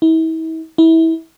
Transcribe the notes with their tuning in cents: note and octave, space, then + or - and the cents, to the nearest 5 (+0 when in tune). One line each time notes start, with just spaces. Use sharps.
E4 -40
E4 -25